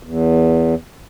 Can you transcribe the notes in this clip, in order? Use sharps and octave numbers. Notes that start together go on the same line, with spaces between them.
E2